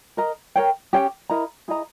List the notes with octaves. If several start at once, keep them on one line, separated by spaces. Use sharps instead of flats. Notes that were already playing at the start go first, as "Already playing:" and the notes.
A#4 D#5 A#5
A#4 C#5 G5
C#4 G4 C#5 G5
E4 A#4 D#5 A#5
E4 G#4 D#5 A#5